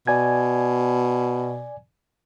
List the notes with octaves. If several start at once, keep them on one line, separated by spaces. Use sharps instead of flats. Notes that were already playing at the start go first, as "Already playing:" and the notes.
B2 D5 G#5 G#6